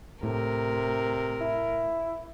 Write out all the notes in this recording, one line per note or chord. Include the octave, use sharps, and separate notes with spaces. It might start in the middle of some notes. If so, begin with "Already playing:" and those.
A2 C3 A#4
E4